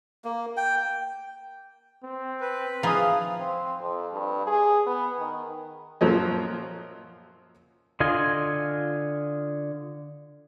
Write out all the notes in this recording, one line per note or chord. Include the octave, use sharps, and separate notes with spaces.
A#3
G5
C4
B4
F3 D#4 E4 G#4 F5 D#6
C4
F2
G2
G#4
B3
D#3
F#2 A#2 F3 F#3 D#5
D3 F4 D#5 G#5